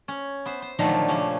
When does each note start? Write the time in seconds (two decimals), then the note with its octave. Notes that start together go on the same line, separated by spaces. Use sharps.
0.08 C#4
0.46 B3 C5 E5
0.62 C5
0.79 A#2 D3 D#3 F3 F#3 A3
1.08 C#3 F3 C#4 G4